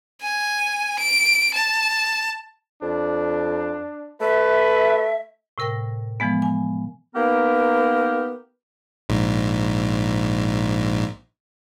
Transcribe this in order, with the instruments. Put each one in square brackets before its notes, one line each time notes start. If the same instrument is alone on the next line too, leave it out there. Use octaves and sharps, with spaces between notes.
[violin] G#5
D7
A5
[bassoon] F2 [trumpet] D4
[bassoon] A3 [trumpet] B4 [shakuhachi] E5
[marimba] A2 C3 A#4 G5 A#6
E3 F3 G#3 B3
G#5
[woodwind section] A#3 B3 D#4 G4 A#4 B4
[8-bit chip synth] A#1 G#2